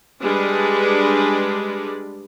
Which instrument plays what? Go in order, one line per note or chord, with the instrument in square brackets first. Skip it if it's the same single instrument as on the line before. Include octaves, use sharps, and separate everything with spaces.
[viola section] G3 G#3 D4 G#4 B4 D5